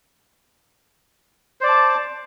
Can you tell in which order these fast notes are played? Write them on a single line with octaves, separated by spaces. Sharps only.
C5 D5 D6 A5